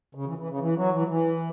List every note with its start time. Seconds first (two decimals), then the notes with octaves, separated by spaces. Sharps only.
0.15 C#3
0.26 E3
0.38 E3
0.49 C#3
0.60 E3
0.76 F#3
0.91 E3
1.07 E3